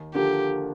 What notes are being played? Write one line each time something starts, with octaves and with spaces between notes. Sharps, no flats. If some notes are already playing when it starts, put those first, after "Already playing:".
Already playing: D#2
D3 F3 A#3 G4